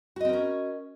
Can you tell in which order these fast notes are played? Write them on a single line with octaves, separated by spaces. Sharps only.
F#4 D#5 C4 A#4 C#4